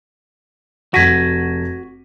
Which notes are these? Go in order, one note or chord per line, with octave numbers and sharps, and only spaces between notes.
F1 F#4 G#6 A#6 B6 D#7